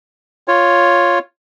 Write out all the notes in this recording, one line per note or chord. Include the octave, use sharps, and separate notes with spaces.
F4 C#5